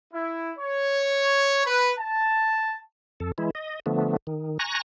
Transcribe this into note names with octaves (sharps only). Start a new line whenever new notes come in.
E4
C#5
B4
A5
F2 A4
E3 G#3 E4
D#5
D3 F3 A3 B3
D#3
G#5 A#5 C#6 F#6 A#6